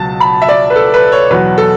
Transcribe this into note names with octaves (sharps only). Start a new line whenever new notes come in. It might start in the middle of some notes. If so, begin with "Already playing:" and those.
Already playing: C#2 B2 F#3 A5
B5
E5
D5
B4
A4
B4
C#5
E2 B2 F#3 B4
A4